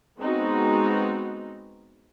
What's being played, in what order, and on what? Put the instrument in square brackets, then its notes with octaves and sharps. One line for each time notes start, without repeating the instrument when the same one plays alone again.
[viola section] G#3 B3 C4 D#4 F#4